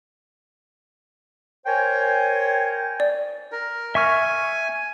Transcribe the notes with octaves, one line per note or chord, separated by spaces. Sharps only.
A#4 C5 C#5 G5 G#5
D5
A#4
E5 G#5 C#6 F6